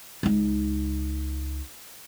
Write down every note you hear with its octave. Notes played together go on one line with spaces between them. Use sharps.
C#2 D#4